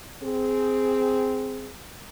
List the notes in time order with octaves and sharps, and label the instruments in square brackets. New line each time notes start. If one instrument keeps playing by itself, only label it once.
[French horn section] C4 G#4